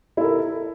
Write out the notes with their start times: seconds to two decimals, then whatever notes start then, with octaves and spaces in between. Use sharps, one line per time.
0.17 E4
0.21 A4
0.24 A#4